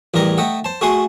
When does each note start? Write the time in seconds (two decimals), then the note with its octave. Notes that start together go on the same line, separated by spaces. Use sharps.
0.14 A1 E2 G3 A#4 D#5 A#5
0.38 A3 D#5 F#5 G5
0.64 C5 A5
0.81 A3 F#4 G#4 F#5 C6 D#6